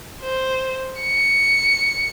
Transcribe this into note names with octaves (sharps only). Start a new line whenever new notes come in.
C5
C#7